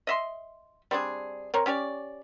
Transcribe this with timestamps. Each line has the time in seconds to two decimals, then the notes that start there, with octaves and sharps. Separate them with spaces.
0.07 D#5 E5 C6
0.91 G3 C4 D4 G#4
1.54 C4 A#4 C#5
1.66 C#4 G4 C#5 D5